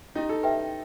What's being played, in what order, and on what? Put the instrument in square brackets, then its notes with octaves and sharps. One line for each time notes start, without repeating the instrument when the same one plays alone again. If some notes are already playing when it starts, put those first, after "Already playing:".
[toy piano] C#4 E4 G4 [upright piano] D#4
[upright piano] A4
[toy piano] G4 B4 E5 G5